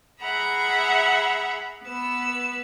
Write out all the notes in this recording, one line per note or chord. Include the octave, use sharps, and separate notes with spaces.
G#4 E5 F#5 A#5 B5
B3 B4 E6